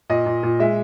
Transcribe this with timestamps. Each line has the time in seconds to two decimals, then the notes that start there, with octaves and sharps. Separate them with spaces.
0.10 A#2 D#5
0.26 A#2
0.43 A#2
0.59 G#3 E5